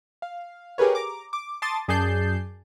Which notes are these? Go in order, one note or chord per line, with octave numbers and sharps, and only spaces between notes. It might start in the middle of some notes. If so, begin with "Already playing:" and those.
F5
G4 G#4 A#4 B4 C#5
A#5 D6
D6
A5 C6 D6 D#6 A6
F#2 G#4 D5 A5 G6 C7